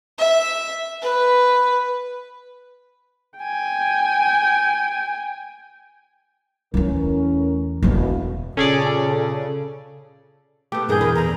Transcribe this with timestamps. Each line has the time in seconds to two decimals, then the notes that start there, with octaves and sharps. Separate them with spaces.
0.19 E5
1.02 B4
3.38 G5 G#5
6.74 E2 E3 A3 C#4 A#4
7.83 E1 A1 B2 D4
8.57 A#2 C#3 C#4 G#4 A4 D5
10.72 A3 B3 G4
10.89 G2 A#2 E3 G#4 A#4 G6
11.01 E2 A#4 B4
11.15 B2 D3 A#5